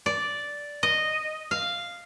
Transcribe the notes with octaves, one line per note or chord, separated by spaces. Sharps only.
D5
D#5
F5